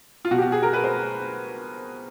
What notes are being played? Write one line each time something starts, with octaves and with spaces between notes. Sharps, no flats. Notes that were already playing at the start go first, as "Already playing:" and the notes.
F4
B2 F#4
G4
F#4
G#4
A#4
B4
C5